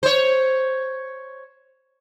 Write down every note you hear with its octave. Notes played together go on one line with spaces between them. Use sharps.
C5 C#5